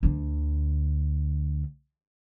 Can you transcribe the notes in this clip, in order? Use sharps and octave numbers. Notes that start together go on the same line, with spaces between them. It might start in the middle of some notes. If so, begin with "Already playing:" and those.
D2 D3